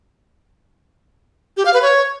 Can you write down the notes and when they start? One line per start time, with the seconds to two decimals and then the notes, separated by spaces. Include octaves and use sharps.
1.57 G4
1.65 F5
1.74 B4
1.82 C#5